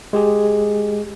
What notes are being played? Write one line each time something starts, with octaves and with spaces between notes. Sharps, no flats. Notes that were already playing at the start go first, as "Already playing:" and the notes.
G#3 G4 G#4